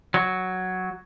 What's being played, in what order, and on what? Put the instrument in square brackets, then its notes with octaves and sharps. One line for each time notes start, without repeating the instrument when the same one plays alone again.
[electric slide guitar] F#3